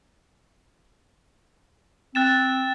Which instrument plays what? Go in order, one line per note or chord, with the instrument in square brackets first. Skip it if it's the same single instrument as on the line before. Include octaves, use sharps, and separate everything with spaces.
[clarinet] C4 [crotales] F#6 A6 E7